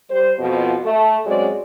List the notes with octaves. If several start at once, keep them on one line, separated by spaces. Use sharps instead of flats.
G3 C5
F2 B2 F3
A3
G#2 F#3 G#3 C4 C#4 D5